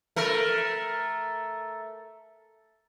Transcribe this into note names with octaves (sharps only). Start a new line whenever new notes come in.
A3 A#4